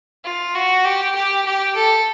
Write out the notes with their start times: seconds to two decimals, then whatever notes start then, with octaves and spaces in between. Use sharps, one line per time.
0.25 F4
0.55 F#4
0.85 G4
1.15 G4
1.45 G4
1.75 A4